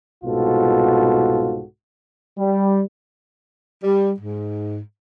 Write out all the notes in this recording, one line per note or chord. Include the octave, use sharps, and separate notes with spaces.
C2 G#2 B2 F4 F#4 A4
G3
G3
G#2